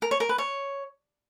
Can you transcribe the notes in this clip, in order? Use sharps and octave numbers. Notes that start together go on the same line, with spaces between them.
A#4
C#5
A#4
B4
C#5